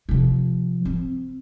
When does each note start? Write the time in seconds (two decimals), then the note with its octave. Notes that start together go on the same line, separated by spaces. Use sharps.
0.09 C3 F3
0.85 C4